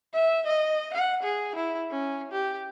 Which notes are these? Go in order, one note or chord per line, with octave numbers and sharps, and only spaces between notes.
E5
D#5
F#5
G#4
E4
C#4
G4